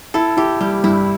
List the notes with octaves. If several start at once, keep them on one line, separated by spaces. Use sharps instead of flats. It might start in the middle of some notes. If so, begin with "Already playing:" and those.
E4 A4
E4 G4
G3 G4
G2 E4